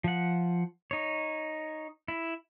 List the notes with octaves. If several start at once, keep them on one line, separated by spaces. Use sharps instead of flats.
F3 F#5
D#4 C#5
E4